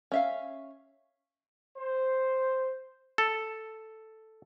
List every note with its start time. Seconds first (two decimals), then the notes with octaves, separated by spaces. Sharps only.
0.12 C#4 E5 F5
1.77 C5
3.18 A4